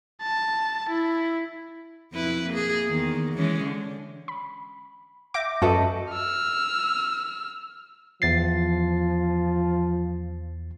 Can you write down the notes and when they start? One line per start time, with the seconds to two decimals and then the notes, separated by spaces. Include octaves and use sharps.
0.22 A5
0.89 E4
2.13 F2 E4 B4
2.50 A#3 G#4
2.88 E2 D#3
3.34 E3 G#3 C#4
3.64 D3
4.28 B5
5.34 E5 D6 G6 A#6
5.62 F#2 F#4 A4 B4 D#5 E5
6.11 E6 F6
8.22 E2 F3 A6 C7